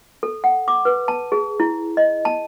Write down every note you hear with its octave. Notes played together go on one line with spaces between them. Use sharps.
A4
F#5
D6
B4
A5
G#4
E4
D#5
A5